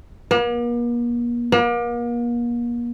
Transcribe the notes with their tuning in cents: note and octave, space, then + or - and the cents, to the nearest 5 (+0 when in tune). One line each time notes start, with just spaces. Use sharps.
A#3 +45
A#3 +40